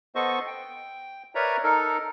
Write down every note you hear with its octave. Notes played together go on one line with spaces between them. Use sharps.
B3 A4 C5 D#5 C#6
G5
A#4 B4 C#5 D5 E5 A#5
D#4 A4 A#4